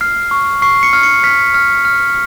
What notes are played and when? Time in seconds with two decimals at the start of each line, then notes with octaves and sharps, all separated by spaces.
0.01 F6 C7
0.31 C#6
0.62 C#6 C7
0.83 C#7
0.93 F6
1.03 C#7
1.24 F6 B6
1.54 F6
1.85 F6